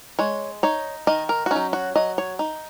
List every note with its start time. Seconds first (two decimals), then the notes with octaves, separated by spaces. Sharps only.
0.19 G#3 C#5
0.63 D#4 C#5
1.07 D#3 D#5
1.29 A#4
1.46 F#4
1.51 F#3 C#4 D#4
1.73 F#4
1.96 F#3 D#5
2.18 C#5
2.39 D#4